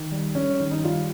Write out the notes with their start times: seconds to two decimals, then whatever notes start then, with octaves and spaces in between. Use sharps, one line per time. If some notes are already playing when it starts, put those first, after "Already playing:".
Already playing: D#3
0.12 G3
0.35 G3 C#4
0.60 D#3
0.71 D#4
0.83 G3 F4